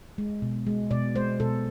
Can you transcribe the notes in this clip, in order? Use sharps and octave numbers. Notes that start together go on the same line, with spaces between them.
G#3
B2
G#3
B2 D5
G#3 C5
B2 A4